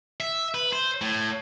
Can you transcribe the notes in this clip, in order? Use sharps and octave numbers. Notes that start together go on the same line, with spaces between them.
E5
B4
C5
A2